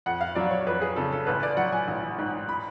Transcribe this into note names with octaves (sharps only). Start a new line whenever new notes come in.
F2 F#5
F5
F#3 D5
C#5
F2 B4
G#4
C#3 A4
A4
A1 B4
D5
F#3 F#5
G#5
A1
G#2
B5